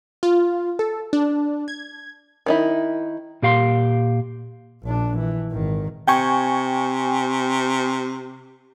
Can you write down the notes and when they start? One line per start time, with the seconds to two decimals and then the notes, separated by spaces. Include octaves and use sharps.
0.23 F4
0.79 A4
1.13 D4
1.68 G#6
2.46 D#3 D#4 E4
3.43 A#2 G4 F5 B5 C6
4.83 A#1 D4
5.17 E3
5.52 G#1 D#3
6.08 C3 G5 G#5 C#6